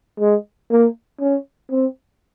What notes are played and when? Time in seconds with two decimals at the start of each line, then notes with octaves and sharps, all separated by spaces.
0.20 G#3
0.71 A#3
1.21 C#4
1.72 C4